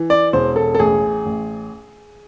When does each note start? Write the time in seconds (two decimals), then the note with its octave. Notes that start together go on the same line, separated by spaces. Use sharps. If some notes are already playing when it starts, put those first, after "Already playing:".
Already playing: E3
0.10 D5
0.33 E1 C5
0.56 A4
0.75 A4
0.79 A1 G#4
1.26 A1